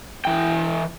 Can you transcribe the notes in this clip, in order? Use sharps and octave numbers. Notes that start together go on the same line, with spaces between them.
E3 G5